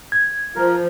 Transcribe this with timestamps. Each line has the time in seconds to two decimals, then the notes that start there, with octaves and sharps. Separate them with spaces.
0.12 G#6
0.55 F3 A#4